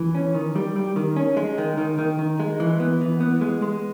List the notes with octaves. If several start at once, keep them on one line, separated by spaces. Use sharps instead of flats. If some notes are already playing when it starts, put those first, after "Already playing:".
Already playing: E3
C#4
D#3
G3
G3
D#3
C#4
G#3
D#3
D#3
D#3
D#3
G#3
E3
B3
E3
B3
G#3
G#3